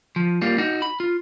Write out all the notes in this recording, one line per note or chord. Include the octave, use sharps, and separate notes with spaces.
F3
G3 A#3 F4
D#4 F#4
B5
F4